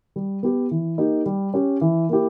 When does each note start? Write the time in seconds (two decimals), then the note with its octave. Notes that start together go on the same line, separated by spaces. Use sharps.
0.16 G3
0.43 B3 G4
0.71 E3
0.98 A#3 D#4 G4
1.26 G3
1.54 C#4 G4
1.81 E3
2.09 A#3 E4 G4